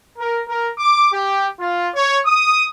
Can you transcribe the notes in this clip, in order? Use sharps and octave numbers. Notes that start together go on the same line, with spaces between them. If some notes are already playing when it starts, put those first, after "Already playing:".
A#4
A#4
D6
G4
F4
C#5
D#6